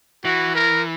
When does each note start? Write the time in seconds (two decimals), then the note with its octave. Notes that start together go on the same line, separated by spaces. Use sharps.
0.25 E3 F#4
0.55 A#4